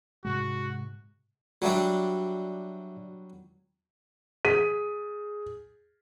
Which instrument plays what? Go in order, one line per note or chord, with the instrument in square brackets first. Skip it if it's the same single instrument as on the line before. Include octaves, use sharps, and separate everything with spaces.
[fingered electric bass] G#2 C3 G#3 [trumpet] F#4
[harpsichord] F#3 G3 D4 [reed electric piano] F#4 D5 E5
[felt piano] G#4 B6 D#7